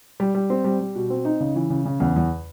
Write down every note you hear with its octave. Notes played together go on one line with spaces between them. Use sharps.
G3
G3
C4
G3
G3
B2
C4
D#4
C#3
E3
C#3
C#3
E2
E2